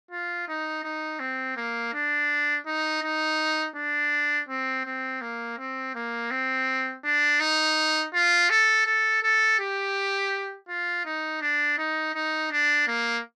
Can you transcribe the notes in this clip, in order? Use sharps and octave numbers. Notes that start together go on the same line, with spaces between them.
F4
D#4
D#4
C4
A#3
D4
D#4
D#4
D4
C4
C4
A#3
C4
A#3
C4
D4
D#4
F4
A4
A4
A4
G4
F4
D#4
D4
D#4
D#4
D4
A#3